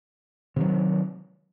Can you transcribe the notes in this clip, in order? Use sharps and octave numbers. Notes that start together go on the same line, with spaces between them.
C3 D#3 F#3